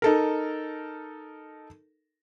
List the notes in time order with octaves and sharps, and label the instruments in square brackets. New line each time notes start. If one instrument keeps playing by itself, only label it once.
[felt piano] D#4 A4 A#4